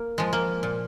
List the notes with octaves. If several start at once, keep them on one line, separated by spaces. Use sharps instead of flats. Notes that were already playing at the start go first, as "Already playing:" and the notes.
Already playing: A#3
F3 G#3
A#3
A#2